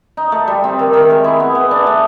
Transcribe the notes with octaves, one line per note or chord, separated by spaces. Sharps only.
D#4
A3
G3
C4
D#3
D#3
G#3
E4
B3
B3
D4
A3